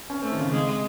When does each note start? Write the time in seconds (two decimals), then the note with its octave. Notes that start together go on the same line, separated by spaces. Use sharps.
0.10 C#4
0.22 A3 C4
0.32 D#3
0.41 C#3
0.51 C3 G#3